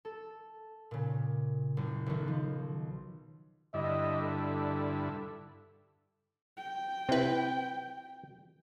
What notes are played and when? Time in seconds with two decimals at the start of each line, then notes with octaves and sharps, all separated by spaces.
0.05 A4
0.91 A#2 C#3
1.77 F#1
2.06 B1 D#3
2.28 F3
3.74 G2 D3 E4 D#5
4.22 A4
6.57 G5
7.09 C3 C4 E4 B4